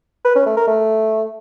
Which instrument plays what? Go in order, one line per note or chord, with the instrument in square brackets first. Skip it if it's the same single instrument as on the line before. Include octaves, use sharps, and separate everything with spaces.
[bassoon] B4
C#4
A3
A#4
A3